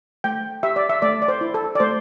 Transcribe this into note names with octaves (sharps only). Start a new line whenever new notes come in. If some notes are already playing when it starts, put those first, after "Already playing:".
A3 G5
G4 E5
D5
E5
A3 D5
D5
C5
E4
A4
D5
A3 C5